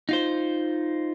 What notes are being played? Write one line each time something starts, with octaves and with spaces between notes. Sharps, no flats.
D#4 F4 C5